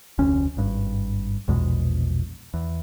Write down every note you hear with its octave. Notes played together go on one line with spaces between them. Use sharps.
F1 D2 C#4
G#1 G2
A#1 E2 B2 G#3
E2